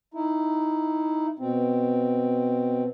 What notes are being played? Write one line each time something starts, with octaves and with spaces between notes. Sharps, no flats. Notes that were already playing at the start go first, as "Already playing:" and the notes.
D#4 E4
B2 C4